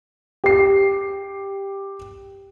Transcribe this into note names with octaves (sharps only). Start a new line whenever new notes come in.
G4 C7